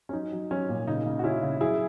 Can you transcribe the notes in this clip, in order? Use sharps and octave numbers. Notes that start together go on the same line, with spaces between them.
C#4
F#3 D#4
F#3
F#3 C#4
A#2
C#3 D#4
C#3
F#4
C#3 C#4 E4
C#3
F#3 E4 G#4